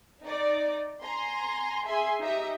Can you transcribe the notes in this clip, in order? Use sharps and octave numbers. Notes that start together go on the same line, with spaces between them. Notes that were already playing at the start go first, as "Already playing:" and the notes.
D#4 D5
G#5 A#5 C6
G#4 E5 G#5 C6
D#4 G4 D#5 E5